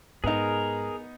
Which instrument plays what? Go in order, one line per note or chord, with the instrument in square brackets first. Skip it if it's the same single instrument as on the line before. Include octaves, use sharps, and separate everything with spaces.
[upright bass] G#2 [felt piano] B3 D#4 [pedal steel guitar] G#4 A#4